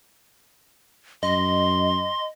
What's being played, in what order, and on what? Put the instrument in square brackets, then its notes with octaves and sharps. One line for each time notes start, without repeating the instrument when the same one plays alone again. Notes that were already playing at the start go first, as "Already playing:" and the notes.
[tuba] F#2 [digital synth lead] D#5 [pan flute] C6